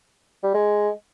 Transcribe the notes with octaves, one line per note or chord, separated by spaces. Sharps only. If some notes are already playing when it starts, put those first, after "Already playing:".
G3
G#3